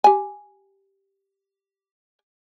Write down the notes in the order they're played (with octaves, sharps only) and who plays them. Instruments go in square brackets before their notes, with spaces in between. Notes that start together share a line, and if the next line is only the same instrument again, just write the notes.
[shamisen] G4 G#5